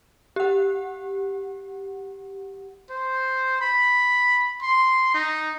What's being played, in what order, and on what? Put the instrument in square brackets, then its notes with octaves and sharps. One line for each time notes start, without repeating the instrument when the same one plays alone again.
[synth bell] G4 F#5
[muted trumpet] C5
B5
C6
D#4